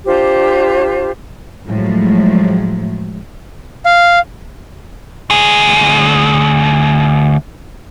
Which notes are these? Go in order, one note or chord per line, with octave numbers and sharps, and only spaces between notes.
D4 F4 G4 C5
A2 F3 F#3 G#3
F5
D2 G#4